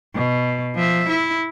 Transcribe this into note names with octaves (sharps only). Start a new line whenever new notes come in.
B2
F3 E5
E4